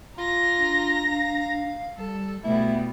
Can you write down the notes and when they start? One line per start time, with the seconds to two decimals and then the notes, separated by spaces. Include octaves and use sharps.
0.18 F4 A#5 A#6
0.58 D4
1.08 F5
1.97 G3 A4
2.44 B2 G3 A3 B3 E4